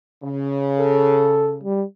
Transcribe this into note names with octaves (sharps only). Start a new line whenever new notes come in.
C#3
A4
G3